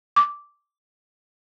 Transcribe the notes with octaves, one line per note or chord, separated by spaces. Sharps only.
D6